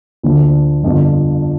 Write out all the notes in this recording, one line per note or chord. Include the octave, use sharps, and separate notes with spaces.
D2 D3 F3
G1 F2 D3 F3